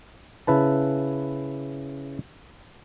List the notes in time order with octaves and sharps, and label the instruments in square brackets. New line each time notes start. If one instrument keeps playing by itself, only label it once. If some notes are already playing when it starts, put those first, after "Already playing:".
[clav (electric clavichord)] C#3 E4 B4 A5